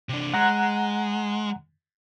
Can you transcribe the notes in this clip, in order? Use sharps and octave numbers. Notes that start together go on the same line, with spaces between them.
C3 D4
G#3 F#5 A#5 F#6